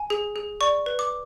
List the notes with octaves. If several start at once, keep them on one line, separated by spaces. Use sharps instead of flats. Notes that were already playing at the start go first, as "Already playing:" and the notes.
Already playing: G#5
G#4
G#4
D5 C#6
B4
D6